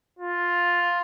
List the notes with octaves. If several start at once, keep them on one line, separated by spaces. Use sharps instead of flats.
F4